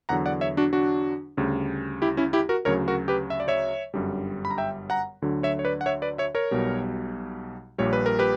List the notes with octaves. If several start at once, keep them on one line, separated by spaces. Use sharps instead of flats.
E2 D3 F#3 F#5 A#5
D5 F#5
C#5 E5
D4 F#4
D4 F#4
D2 C#3 G3
E4 G4
C#4 E4
E4 G4
F#4 A#4
D2 C#3 F#3 A#4 C#5
F#4 A#4
G4 B4
E5
D5
C#5 E5
G1 F#2 D3 G3
B5
A#5
E5 G5
F#5 A#5
D2 D3 F#3
C#5 E5
C#5
B4 D5
F#5
C#5 E5
B4 D5
C#5 E5
A#4 C#5
B1 B2 G3
A#1 A#2 G3 C#5
B4
A#4
G4 B4